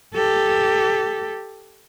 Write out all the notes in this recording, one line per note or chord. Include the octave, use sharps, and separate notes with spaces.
G4 A4